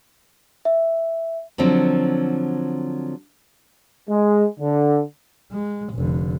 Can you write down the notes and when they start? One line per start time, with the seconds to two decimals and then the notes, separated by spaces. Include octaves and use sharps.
0.65 E5
1.58 D3 F3 F#3 C4
4.09 G#3
4.60 D3
5.52 G#3
5.94 F1 D3